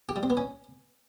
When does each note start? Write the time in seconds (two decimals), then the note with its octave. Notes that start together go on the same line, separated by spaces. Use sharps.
0.09 G4
0.16 G3
0.23 C4
0.30 B3
0.37 C#4